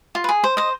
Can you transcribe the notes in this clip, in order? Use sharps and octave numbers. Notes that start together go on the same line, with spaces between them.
F4
B4
G#4
C5
C5 D#5